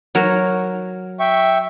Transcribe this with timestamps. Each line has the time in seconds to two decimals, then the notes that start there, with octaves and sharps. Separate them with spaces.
0.15 F#3 A#4 C#5
1.20 E5 G5 C#6